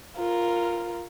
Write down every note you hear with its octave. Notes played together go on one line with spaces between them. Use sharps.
F4 A#4